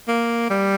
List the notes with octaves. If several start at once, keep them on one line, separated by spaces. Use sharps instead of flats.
A#3
G3